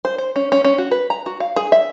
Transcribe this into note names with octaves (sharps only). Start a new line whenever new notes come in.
C5
C5
C#4
C#4
C#4
F#4
B4
A#5
F#4
F5
G#4
E5